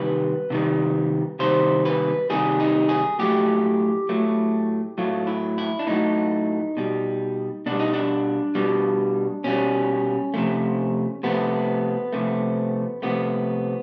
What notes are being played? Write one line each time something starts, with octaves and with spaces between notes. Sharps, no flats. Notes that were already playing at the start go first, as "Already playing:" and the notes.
Already playing: C3 D#3 G3 B4
C3 D#3 G3
C3 D#3 G3 C5
B4
C3 D#3 G3 G#4
D#4
G#4
A2 F#3 A3 G4
A2 F#3 A3
A2 F#3 A3 F4
E4
E4
D4
A2 F#3 A3 D#4
B2 G3
B2 G3 D4
D#4
D4
B2 G3
B2 G3 C#4
C3 F3 A3
C3 F3 A3 B3
C3 F3 A3
C3 F3 A3 B3